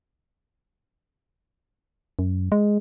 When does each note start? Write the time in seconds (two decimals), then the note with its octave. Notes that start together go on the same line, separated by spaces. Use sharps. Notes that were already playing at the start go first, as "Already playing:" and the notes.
2.19 F#2
2.52 G#3